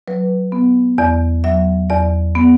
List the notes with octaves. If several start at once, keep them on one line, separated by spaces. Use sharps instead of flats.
F#3 B4
B3
E2 D5
F#3 E5
E2 D5
B3